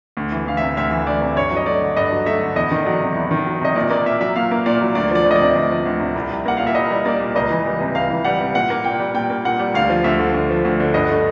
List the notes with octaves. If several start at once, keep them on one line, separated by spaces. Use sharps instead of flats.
D2
E3
D2 F5
C3 E5
D2 E5
E3
D2 D5
C3
G2 C#5
F#3
D#5
A3 D5
D3
G2 D#5
F#3
A3 E5
D3
E2 D#5
D#3
F#3 D5
C3
E2
D#3
F#3
C3 D#5
A#2 D5
A#3 D5
A#2 E5
F#3 E5
A#2 F5
A#3
A#2 D5
F#3
D2 D5
F3 D5
D2
D#5
C3 D5
D2
F3
D2
C3
C2
G3
A#3 F#5
A#2 F5
E5
C2 D#5
G3
A#3 D5
A#2
C#2 D#5
E3
G3
C3
C#2 F5
E3
G3 F#5
C3
A#2 F#5
A#3
A#2 G5
G3
A#2 G5
A#3
A#2 F#5
G3
D2 F5
F3
D2 E5
D3
D2
F3
D2
D3
G2 D#5
A3